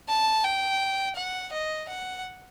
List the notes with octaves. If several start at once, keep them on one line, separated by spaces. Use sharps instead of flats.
A5
G5
F#5
D#5
F#5